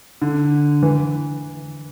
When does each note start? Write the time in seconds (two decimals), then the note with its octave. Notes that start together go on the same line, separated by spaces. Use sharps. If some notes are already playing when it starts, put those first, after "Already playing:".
0.22 D3
0.83 E3